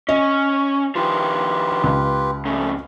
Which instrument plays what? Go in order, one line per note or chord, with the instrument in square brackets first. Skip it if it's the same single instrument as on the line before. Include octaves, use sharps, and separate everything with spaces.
[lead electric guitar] C#4 [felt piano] D#5
[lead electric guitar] D#3 F3 [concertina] F4 G4 B4
[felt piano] C#2
[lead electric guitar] F2 C#3 [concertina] A3